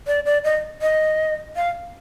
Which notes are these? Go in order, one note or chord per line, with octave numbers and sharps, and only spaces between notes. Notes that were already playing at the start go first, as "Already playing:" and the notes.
D5
D5
D#5
D#5
F5